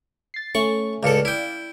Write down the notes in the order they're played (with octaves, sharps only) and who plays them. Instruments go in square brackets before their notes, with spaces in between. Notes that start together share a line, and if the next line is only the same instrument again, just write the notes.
[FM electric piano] A6 C7
[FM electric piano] A3 C#4 [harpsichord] C#6
[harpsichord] C#2 A2 A4 [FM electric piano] D5 F5
[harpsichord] E4 G5